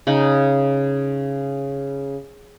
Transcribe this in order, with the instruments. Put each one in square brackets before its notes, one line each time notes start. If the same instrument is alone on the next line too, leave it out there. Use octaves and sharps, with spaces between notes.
[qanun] C#3 D#4 B5